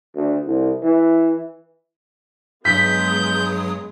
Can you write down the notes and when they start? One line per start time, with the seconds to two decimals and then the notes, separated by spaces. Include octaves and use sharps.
0.15 D2
0.47 C2
0.83 E3
2.65 G2 F#3 G#3 B3 D#6 G6 B6